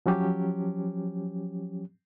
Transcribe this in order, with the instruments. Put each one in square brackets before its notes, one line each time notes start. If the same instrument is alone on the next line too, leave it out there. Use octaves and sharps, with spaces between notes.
[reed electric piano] F3 F#3 C#4 G4